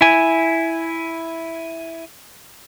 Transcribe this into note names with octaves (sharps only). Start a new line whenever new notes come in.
E4 G#5